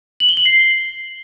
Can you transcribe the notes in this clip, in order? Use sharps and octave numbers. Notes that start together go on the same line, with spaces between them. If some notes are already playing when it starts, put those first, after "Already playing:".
F#7
G7
F#7
C7